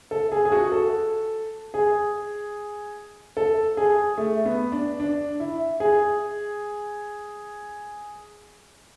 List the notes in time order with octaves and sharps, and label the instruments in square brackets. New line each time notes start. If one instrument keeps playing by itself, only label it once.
[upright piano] A4
G#4
G#4
F#4
A4
G#4
A4
G#4
A3
B3
D4
D4
E4
G#4